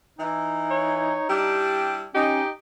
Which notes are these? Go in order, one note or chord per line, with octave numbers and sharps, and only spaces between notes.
E3 D#4
C#5
G3 D4 E4 G4
C#4 D#4 G4